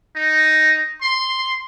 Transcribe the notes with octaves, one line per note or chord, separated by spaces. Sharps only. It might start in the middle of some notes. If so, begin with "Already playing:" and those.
D#4
C6